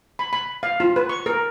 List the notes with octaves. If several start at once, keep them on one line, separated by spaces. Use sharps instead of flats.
B5
B5
F5
F4
B4
C#6
A#4